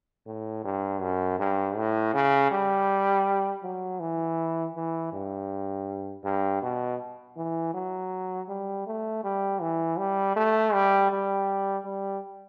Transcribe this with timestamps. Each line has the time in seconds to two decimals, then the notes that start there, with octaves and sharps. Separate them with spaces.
0.27 A2
0.64 G2
1.02 F#2
1.39 G2
1.76 A2
2.14 C#3
2.52 G3
3.63 F#3
4.00 E3
4.76 E3
5.13 G2
6.24 G2
6.62 B2
7.37 E3
7.74 F#3
8.49 G3
8.87 A3
9.24 G3
9.61 E3
9.98 G3
10.36 A3
10.73 G3
11.10 G3
11.85 G3